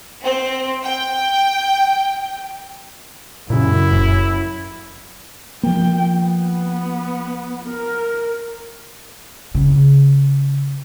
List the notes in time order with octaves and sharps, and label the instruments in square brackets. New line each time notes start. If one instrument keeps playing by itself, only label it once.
[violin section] C4
G5
[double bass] F#2 [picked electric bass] A#2 C#3 [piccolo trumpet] E4
[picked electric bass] F#1
[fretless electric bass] F3 A#3 [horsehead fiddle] G5
[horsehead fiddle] B3
A#4
[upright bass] C#3